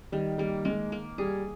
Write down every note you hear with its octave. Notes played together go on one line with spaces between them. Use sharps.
D#3 G3
G3 A#3
G#3 A#3
A#3
G3 G#4